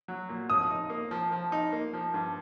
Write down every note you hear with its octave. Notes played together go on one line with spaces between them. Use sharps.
F#3
A#2
F3 D#6
D#4
A#3
F3
F3
D#4
A#3
F3
G2